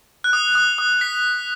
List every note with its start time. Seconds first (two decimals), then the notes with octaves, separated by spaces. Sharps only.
0.24 F#6
0.33 D#6
0.55 D#6
0.78 D#6
1.01 B6